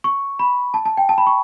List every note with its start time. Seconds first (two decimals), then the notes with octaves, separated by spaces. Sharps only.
0.04 C#6
0.39 B5
0.74 A5
0.85 A5
0.97 G5
1.09 A5
1.18 B5
1.27 C#6